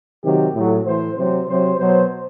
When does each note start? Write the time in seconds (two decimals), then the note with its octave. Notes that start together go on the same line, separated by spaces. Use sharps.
0.23 C3 D#3 F#3 G4
0.54 A2 F#3
0.85 A2 E3 C5
1.17 C3 F#3 C5
1.48 C3 F#3 C5
1.79 B2 F#3 C5